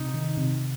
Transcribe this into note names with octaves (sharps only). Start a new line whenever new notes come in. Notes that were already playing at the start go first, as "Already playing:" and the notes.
Already playing: C3 D#4
D#3
C3